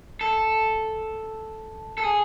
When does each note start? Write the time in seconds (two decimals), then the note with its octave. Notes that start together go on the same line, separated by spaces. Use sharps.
0.21 A4
1.98 A4
2.03 G#4